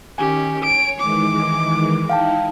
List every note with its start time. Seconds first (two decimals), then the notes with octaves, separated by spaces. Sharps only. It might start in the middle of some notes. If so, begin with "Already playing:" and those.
0.18 D#3 C#4 G4 G#5
0.64 C#5 D7
1.00 D#3 E3 G#3 D6
2.09 D#4 E4 F5 G5 A5